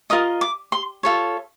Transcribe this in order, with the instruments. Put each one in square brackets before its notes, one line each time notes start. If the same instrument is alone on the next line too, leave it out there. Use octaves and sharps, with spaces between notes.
[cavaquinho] F4 A#4 D#5 D#6
D6
C6
F4 A4 C#5